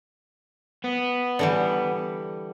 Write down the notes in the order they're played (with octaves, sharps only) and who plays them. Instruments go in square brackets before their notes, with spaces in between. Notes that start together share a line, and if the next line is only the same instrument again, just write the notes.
[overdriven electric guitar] B3
[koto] D3 E3 G3